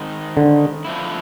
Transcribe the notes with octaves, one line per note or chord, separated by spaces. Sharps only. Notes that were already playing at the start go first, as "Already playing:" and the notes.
Already playing: D#3 G#3 C4 D#4
D3
D3 F3 A3 C4 E4